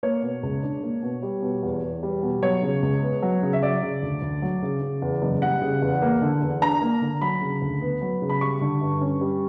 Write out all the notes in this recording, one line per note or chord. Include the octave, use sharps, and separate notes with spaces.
A#3 C#5
B2
C#2
D4
A#3
B2
G3
B2
E2
E2
G3
B2
F#3 C#5
C#3
C#2
B3
F#3
C#3
E5
F#3 D5
C#3
D2
D2
F#3
C#3
C#3
E2
F#1
G3 F#5
C#3
E2
A#3
D3
E2
D4 A#5
A#3
D3
F#3 B5
C#3
D2
B3
F#3
C#3
B5
G3 C#6
D3
G2
C#4
G3